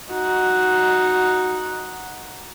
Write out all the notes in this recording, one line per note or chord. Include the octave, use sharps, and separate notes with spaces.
D#4 F#4